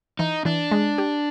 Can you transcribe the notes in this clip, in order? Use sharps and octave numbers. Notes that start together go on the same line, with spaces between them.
E3 D#4
E3 D4
G#3
G4